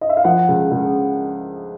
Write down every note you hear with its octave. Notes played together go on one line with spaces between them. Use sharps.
D#5
E5
F5
F3 F#5
C#2
C#2